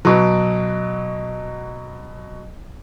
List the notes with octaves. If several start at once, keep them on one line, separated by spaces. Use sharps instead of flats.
B2 F#3